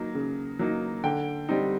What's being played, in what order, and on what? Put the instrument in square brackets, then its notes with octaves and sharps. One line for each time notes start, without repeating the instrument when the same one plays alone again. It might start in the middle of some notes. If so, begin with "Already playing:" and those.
Already playing: [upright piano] F#3 A#3 D#4
C#3
F#3 A#3 D#4
D3 G5
G3 C4 D#4